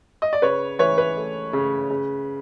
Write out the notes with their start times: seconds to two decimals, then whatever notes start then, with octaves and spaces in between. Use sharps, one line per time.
0.22 D#5
0.33 D5
0.42 C#3 B4 C#5
0.79 E3 B4 C#5
0.98 B4
1.17 A3
1.53 C#3
1.90 C#3